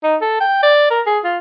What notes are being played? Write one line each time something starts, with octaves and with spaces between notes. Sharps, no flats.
D#4
A4
G5
D5
A#4
G#4
F4